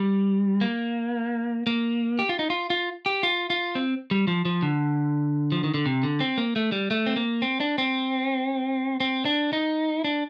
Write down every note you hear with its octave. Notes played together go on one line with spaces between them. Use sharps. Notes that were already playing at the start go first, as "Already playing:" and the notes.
Already playing: G3
A#3
A#3
G4
F4
D#4
F4
F4
G4
F4
F4
C4
G3
F3
F3
D3
F3
D#3
D3
C3
D3
C4
A#3
A3
G3
A3
C4
A#3
C4
D4
C4
C4
D4
D#4
D4